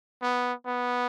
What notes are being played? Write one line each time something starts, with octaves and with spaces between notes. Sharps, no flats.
B3
B3